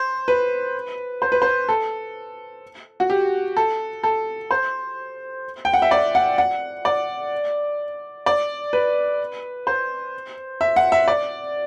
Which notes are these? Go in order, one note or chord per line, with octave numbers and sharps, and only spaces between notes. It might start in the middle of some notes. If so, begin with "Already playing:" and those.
Already playing: C5
B4
C5
B4
C5
A4
F#4
G4
A4
A4
C5
G5
F#5
E5
D5
F#5
F#5
D5
D5
B4
C5
E5
F#5
E5
D5